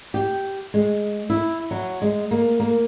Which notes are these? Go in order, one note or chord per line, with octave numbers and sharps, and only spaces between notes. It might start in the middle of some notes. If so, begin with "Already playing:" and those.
G4
G#3
E4
F#3
G#3
A#3
A#3